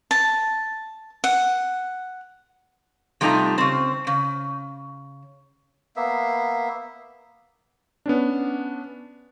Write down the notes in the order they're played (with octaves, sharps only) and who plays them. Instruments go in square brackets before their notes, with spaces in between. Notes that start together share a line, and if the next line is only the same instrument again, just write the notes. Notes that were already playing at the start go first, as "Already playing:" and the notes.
[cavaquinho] A5
F#5
[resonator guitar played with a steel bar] C3 G3 A3 D#4 F4 A#5
C#3 C4
C#3
[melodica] A#3 B3 E5
[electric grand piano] B3 C#4 D4